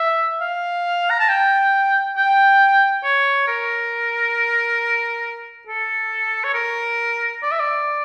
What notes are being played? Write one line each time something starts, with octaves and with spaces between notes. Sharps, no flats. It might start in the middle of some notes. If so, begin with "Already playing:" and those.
Already playing: E5
F5
A#5
A5
G5
G5
C#5
A#4
A4
C#5
A#4
D5
E5
D5